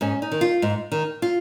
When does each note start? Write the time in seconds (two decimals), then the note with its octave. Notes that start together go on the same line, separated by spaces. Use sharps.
0.01 G#2 C#4
0.22 D#4
0.32 D#3
0.41 F4
0.62 G#2
0.92 D#3
1.22 F4